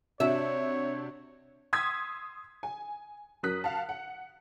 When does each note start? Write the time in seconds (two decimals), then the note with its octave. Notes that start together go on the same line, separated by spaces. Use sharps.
0.20 C3 D4 F#4 C#5 E5
1.73 C6 D#6 E6 G#6 B6
2.63 G#5
3.43 F#2 F#3 A#4 D#6 F#6 B6
3.64 F5 F#5 A5
3.89 F#5